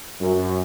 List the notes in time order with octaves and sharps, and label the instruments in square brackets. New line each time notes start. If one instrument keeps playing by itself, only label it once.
[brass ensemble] F#2